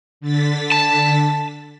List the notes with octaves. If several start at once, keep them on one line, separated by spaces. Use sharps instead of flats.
D3 A6 B6
A5